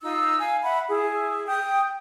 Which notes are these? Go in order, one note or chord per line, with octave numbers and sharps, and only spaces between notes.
D#4 F4 E6
F5 G#5
E5 F#5 B5
E4 G#4
G5 D#6